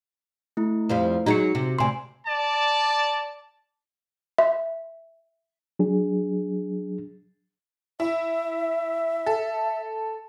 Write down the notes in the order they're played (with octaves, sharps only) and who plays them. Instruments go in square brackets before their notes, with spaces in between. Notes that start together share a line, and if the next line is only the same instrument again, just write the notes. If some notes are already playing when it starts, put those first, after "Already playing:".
[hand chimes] A3 E4
[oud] F2 F3 G3
[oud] F#3 G#3 D#4 [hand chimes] F#4 C#7
[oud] C3
[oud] D2 C3 [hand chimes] D5 G#5 C6
[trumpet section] D5 A5
[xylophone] E5
[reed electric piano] F#3 D4 G#4
[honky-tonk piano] E4 [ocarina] E5
[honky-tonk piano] A4